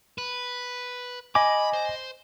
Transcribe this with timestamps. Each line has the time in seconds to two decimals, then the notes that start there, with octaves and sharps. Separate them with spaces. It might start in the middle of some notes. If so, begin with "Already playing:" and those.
0.18 B4
1.35 D#5 G#5 B5 D6
1.73 C5